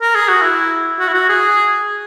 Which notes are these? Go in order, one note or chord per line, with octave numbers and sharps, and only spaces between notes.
A#4
G#4
F#4
E4
F#4
E4
F#4
G#4